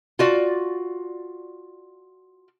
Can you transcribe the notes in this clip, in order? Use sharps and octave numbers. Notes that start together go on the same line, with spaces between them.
F4 F#4 D5